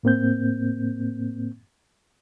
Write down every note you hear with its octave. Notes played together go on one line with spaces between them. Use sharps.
A2 A#3 C4 G6